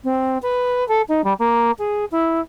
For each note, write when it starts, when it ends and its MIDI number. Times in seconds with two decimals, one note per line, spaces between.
0.04 0.38 60
0.42 0.86 71
0.88 1.02 69
1.08 1.24 63
1.24 1.33 55
1.39 1.71 58
1.78 2.05 68
2.11 2.40 64